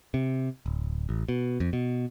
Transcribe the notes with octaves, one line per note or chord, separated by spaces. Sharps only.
C3
D1
A1
B2
F2
B2